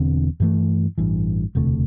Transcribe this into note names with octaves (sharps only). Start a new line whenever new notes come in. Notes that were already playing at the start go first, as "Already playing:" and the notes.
Already playing: E1 E2 D3 C4
G2 E3 A3
A1 G2 E3
E1 D2 C3 A3